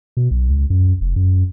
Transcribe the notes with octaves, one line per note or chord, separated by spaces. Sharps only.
B2
B1
C#2
F#2
F1
F#2